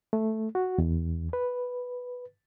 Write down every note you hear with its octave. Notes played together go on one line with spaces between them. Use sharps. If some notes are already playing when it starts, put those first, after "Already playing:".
A3
F#4
E2
B4